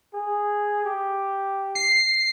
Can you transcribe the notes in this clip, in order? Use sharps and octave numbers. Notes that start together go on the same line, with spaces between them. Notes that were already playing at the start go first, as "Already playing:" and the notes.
G#4
G4
C7